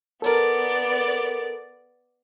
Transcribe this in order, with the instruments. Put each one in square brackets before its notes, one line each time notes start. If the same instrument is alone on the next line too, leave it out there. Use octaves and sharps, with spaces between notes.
[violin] B3 D5 [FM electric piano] A4 A#4